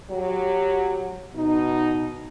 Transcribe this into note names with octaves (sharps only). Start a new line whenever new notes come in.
F#3 G4
B2 D#4